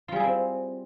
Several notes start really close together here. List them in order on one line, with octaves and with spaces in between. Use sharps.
F4 G3 G#4 E4 C4